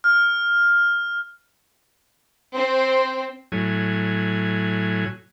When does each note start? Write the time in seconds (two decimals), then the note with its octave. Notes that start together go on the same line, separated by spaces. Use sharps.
0.04 F6
2.54 C4
3.52 A2 F#3 G#5